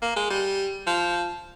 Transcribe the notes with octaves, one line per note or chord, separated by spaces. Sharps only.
A#3
G#3
G3
F3